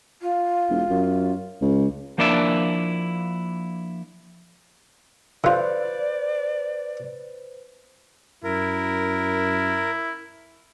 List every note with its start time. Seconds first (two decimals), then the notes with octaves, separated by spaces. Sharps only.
0.22 F4
0.69 E1
0.90 F#2
1.61 C#2
2.18 F3 A#3 D4 E4 D5 E5
5.44 D3 F4 B4 C5 D5
8.44 F#2 E4 A#4